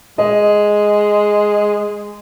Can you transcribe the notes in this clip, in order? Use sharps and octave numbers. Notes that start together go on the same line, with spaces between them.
G#3 D#5